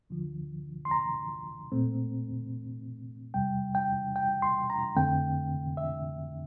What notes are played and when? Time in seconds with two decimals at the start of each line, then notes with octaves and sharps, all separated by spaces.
0.10 D2 D3 F3
0.85 C6
0.91 A#5
1.72 A#2 A3 C4
3.34 E2 C3 G3 G5
3.75 G5
4.16 G5
4.42 C6
4.70 A#5
4.96 F2 D3 A3 C4 G5
5.77 E5